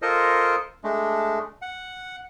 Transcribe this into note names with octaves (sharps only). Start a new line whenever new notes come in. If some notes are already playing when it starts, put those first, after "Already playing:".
F4 A4 A#4 C5 D#5
G#3 A3 D4
F#5